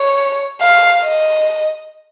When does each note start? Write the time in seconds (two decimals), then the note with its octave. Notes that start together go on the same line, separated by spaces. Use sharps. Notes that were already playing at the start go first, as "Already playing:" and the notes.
Already playing: C#5
0.61 F5
1.02 D#5